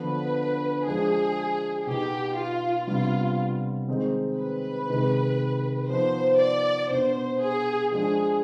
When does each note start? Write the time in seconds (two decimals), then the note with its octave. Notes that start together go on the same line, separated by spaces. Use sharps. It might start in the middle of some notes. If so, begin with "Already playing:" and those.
Already playing: D3 F3 B3 D4 B4
0.86 F3 G#3 D4 G#4
1.87 B2 B3 D#4 G4
2.37 F4
2.87 C3 G3 B3 D4 F4
3.88 D#3 G#3 C4 D#4
4.39 B4
4.89 C3 D#3 G#3
5.90 F3 B3 D#4 C5
6.40 D5
6.90 B2 B3 D4 C5
7.41 G#4
7.91 F3 G#3 D4 G#4